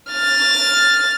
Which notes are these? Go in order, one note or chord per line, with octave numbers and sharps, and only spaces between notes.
F6 A6